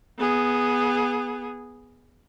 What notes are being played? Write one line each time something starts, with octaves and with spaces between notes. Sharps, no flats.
B3 G#4